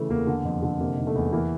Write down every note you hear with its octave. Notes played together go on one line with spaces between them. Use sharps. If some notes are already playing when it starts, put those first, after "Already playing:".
Already playing: C#3 E3 A3
E2 A#3
D3
F2
D3
C3 A#3
D#3
A3
E2
E3 A#3